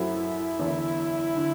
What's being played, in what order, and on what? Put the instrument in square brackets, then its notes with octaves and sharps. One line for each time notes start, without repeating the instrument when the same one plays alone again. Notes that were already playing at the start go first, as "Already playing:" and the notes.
Already playing: [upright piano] F#2 F#3 C4 F#4 A4 [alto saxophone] E4
[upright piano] F#1 E2 D3
D3